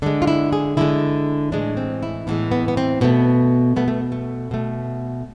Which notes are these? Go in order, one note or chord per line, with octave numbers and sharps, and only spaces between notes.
D3 G#3 D4
F4
E4
G#4
D3 G#3 E4
A2 E3 G#3 D4
C4
E4
A2 E3 G#3 B3
B3
B3
C4
B2 A3 B3
B2 A3 B3
A3
A3
B2 A3